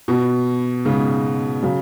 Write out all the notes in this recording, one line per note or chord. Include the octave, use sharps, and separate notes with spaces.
B2
G#2 C#3
C#3 F#3